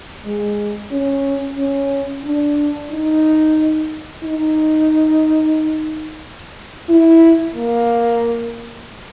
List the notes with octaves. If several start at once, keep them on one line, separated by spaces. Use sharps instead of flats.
G#3
C#4
C#4
D4
D#4
D#4
E4
A#3